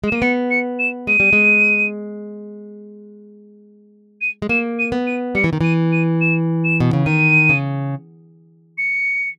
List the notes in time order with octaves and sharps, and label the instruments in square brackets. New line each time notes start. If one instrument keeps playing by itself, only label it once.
[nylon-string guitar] G#3
[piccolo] E7
[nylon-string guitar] A#3 [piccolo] D#7
[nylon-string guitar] B3 [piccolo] C#7
[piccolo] C#7
E7
[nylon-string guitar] G#3 [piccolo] D#7
[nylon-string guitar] G3
G#3
[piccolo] D#7
[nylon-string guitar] G#3
[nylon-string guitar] A#3 [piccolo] E7
[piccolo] D#7
[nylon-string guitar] B3
[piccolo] D#7
[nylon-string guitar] G3 [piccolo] C#7
[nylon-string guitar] E3
D#3
[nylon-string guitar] E3 [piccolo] D#7
[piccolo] D#7
E7
E7
[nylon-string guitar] B2
C#3
[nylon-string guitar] D#3 [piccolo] D#7
[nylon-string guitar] C#3
[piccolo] C#7